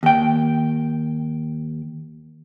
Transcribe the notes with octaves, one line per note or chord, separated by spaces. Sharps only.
D#2 G5